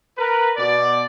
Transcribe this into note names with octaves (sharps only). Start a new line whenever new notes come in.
A#4 B4
B2 D5